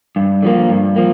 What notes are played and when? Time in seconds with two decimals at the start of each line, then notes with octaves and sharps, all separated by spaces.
0.16 G2
0.43 D3 F3 A#3
0.68 G2
0.96 F3 A#3